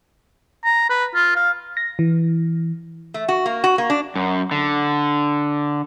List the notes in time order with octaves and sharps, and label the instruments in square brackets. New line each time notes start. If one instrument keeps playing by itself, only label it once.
[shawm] A#5
B4
F4
F5
[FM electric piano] A#6
E3
[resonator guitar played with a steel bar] A3
F#4
A#3
F#4
A#3
D4
[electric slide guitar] F#2
D3